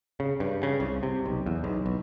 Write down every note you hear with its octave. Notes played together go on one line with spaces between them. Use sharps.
C#3
G2
C#3
C2
C3
B1
E2
B1
B1